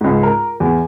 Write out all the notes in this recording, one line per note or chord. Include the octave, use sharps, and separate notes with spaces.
C#2 G#2
A#4
E2